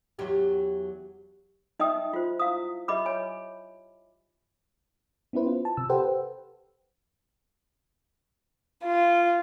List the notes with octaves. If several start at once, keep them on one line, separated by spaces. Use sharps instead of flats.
E2 F#3 G4
D#4 D#5 E5 G5 D#6
F4 F#4 C5
E4 F5 D#6
G4 D#5 E5 B5 D6
C#5 G#5 B5
B3 C#4 E4 B4 C5
F4
A5
C3 E6
G4 A4 B4 C5 F#5 G5
F4